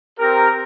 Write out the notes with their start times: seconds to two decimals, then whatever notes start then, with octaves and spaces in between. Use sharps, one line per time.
0.19 C4 G4 A#4